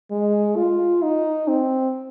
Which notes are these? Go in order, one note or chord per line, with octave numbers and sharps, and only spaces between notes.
G#3
F4
D#4
C4